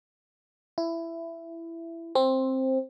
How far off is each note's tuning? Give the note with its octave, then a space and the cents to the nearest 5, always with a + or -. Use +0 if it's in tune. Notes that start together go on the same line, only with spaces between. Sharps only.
E4 +15
C4 +10